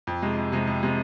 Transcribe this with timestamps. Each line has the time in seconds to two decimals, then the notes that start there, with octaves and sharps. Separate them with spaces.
0.07 F2
0.22 C3 G#3
0.37 F2
0.52 C3 G#3
0.67 F2
0.83 C3 G#3